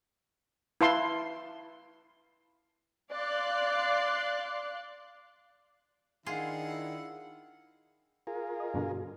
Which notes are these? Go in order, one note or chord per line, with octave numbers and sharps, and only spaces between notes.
E4 B4 F5 A5 C6
D5 F5 C6 F#6
D#3 D4 E4 F4 G#4 F#5
F4 G#4 A#4
D#5
G2 B2 D3